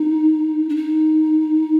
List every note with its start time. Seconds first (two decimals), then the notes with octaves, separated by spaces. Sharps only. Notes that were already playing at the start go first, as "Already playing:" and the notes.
Already playing: D#4
0.69 D4
0.76 D#4